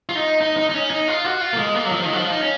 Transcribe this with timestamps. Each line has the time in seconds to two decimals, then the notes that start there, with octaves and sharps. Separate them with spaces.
0.09 F4
0.15 D#4
0.41 D#4
0.57 D#4
0.70 D#4
0.74 C#4
0.90 D#4
1.08 F4
1.25 F#4
1.41 F4
1.53 A#3
1.58 G#3
1.75 A#3
1.86 F#3
1.92 F3
2.04 D#3
2.13 F#3
2.17 F3
2.30 D#4
2.41 C#4